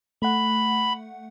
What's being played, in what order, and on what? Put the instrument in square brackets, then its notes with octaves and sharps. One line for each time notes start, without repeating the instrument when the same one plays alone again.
[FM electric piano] A3 F#5 [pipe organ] B5